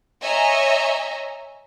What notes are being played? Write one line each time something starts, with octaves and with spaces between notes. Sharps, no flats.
C#5 D#5 E5 G#5 A#5